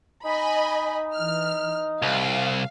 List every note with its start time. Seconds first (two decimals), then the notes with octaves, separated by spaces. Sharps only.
0.24 D#4 D#5 G#5 B5
1.13 E3 F6
2.02 C2 F5